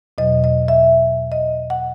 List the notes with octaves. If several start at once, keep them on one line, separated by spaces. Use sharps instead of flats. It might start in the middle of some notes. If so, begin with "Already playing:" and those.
E2 B2 F#3 D#5
D#5
E5
D#5
F#5